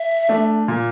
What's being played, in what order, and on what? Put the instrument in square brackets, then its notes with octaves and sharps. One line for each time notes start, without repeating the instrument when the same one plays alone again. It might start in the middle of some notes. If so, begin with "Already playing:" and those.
Already playing: [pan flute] E5
[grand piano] A3 D4
A#2